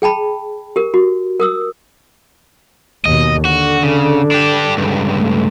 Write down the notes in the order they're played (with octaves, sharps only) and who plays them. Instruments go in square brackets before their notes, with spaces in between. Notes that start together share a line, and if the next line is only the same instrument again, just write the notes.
[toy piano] G#4 G5 A5 B5
G4 A#4
F#4
A#4 D#6 E6
[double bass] D#2 B2 [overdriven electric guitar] D#5
[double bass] D3 [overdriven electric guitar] F#4
[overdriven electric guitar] C#3
D4 G4
C#2 G2
[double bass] A3